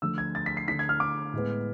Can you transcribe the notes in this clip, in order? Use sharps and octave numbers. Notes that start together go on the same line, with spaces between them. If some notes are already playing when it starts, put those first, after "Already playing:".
D3 F3 A3 E6
G#6
A6
B6
C7
D3 A3 D4 B6
G#6
F6
D6
A2 G#3 B3